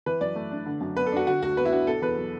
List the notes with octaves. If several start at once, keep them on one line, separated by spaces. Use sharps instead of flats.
E3 B4
F#2 D5
A3
D4
D3
F#2
B3 B4
A4
D4 F#4
D3 F#4
D2 F#4
B3 B4
E4
D4 F#4
B2 A4
E2 B4
F#3